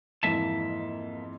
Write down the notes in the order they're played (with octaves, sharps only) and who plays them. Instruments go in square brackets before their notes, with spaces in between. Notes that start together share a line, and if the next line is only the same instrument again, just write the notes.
[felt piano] F2 G#2 E3 [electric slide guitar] A#3 E5 A5